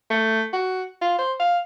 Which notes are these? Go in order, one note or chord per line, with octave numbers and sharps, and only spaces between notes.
A3
F#4
F4
C5
F5